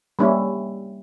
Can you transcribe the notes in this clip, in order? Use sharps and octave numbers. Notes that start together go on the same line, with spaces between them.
G3 A#3 C#4 E4